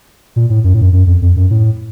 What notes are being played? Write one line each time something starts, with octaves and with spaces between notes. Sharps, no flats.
A#2
A2
F#2
A2
F#2
F#2
F2
F2
F#2
A2